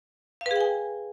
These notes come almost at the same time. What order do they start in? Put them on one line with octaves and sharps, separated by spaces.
F5 B4 G#4 G5 G#5